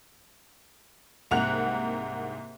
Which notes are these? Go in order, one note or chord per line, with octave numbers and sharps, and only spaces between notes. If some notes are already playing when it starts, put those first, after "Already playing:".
C2 G#2 A#3 F#5 F#6 F7